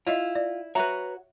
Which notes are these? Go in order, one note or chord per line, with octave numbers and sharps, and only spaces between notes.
E4 F4 C#5 D#5 E5
D5
F#4 B4 C#5 E5 A#5